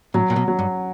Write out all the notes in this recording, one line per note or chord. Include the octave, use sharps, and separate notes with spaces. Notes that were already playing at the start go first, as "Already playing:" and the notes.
A2 F#3
A#2
B2
F#3
G2